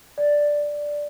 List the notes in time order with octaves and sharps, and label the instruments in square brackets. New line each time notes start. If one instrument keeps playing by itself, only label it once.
[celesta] D5